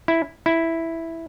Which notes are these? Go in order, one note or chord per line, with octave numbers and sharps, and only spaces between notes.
E4
E4